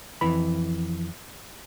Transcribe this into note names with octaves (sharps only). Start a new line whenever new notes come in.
F2 E3 B5